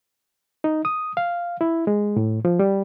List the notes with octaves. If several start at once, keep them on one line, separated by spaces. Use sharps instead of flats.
D#4
D#6
F5
E4
G#3
A2
F3
G3